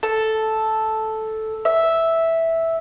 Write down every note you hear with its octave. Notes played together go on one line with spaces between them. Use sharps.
A4
E5